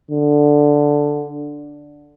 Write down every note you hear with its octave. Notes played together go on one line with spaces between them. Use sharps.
D3